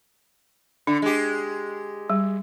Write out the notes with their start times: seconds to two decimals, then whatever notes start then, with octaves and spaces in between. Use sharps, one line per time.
0.87 D3 D4
1.02 G#3 G4
2.10 G3